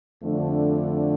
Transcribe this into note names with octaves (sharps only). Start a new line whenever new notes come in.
F2 D3 A3 D4